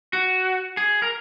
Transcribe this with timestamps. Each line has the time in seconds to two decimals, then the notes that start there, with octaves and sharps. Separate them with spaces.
0.13 F#4
0.77 G#4
1.02 A#4